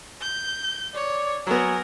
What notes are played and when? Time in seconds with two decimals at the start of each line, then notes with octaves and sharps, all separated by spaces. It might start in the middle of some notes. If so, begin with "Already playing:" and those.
0.21 G6
0.95 C#5 D5
1.47 F#3 B3 A#4 G#5